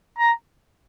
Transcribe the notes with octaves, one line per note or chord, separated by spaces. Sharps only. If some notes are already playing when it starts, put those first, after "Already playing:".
A#5